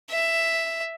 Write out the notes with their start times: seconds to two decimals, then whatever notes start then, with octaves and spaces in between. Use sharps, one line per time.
0.10 E5